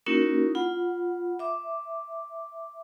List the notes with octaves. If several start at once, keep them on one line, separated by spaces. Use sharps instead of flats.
A#3 C#4 D#4 E4 F#4 A#4
F4 F#5 B5
E5 D6